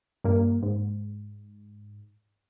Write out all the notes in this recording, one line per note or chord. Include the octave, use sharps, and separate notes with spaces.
G2 A#3
G#2